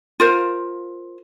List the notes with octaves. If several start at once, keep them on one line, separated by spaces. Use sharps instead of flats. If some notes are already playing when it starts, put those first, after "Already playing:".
F4 A#4 C5